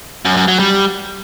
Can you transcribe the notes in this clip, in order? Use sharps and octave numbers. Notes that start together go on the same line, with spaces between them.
F#2
F#2
F#3
G3